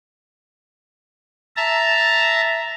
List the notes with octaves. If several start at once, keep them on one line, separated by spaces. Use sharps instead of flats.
E5 A5 A#5